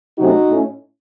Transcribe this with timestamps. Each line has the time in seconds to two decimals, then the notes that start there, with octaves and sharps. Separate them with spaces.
0.18 C3 F#3 A3 C#4 D#4 F#4
0.49 A2 A3 C#4